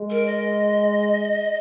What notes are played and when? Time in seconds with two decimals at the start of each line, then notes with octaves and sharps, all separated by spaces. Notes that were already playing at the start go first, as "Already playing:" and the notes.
Already playing: G#3
0.10 A#4
0.26 D#5